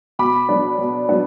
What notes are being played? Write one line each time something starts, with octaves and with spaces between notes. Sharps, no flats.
B2 B5 D6
F#3 B3 D4
B2
F#3 B3 D4